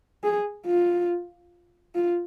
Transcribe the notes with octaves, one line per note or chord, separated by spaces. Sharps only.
G#4
F4
F4